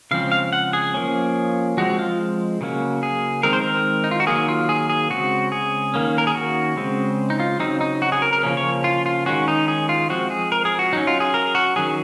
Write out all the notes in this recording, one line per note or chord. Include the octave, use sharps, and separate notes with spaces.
C#3 F3 G#3 C4 F5
F5
F#5
G#4
F3 A#3 C#4
F3 G#3 C4 F#4
F4
C#3 F#3 A#3 C#4
G#4
D#3 G#3 C4 A#4
C5
A#4
D#4
F4
F#4
D#3 F#3 A#3 G#4
F4
G#4
G#4
C#3 G#3 C4 F#4
G#4
D#3 A#3 C#4
A#4
G#4
F#4
C#3 G#3 C4
D#4
F4
C#3 F#3 C4 D#4
D#4
F#4
G#4
A#4
A#4
C#3 F3 A#3 C#4
C#5
F4
F4
D#3 G#3 C#4 F#4
D#4
G#4
F4
F3 G#3 C4 F#4
G#4
A#4
G#4
F#4
F#3 C#4 D#4
F4
G#4
A#4
F#4
D#3 F#3 C#4 G#4